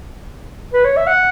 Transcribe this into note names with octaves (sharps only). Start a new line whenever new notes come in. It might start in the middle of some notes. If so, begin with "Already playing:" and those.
B4
C#5
E5
F#5